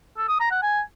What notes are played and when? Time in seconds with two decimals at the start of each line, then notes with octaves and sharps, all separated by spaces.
0.18 A4
0.29 D#6
0.40 A#5
0.51 F#5
0.62 G#5